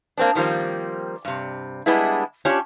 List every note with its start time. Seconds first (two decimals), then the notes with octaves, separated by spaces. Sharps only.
0.18 A#3 C4 D4
0.35 D#3 F3 G3 A#3 C4
1.25 G2 C3
1.86 G3 G#3 B3 D4 E4
2.45 C#4 D4 F4 G4 C#5